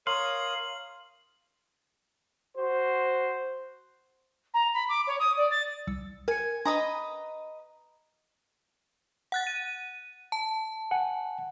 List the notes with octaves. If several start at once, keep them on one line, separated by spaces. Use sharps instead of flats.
A#4 C#5 F5 C6 D#6 F#7
F#4 C5
A#5
B5
D6
C#5
D#6
D5
A6
C2 E6 C#7
A#4 G#5 C#7
D4 B4 D#5 G#5 A#5 C6
F#5 F#6 A6
D#7
A5
F#5 G#5